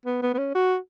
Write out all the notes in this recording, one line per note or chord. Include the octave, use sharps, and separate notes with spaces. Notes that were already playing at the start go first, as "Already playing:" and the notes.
B3
B3
B3
C#4
F#4